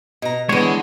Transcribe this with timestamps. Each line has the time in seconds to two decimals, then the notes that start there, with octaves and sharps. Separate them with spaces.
0.22 B2 A#5
0.49 D3 E3 G#3 B3 C#5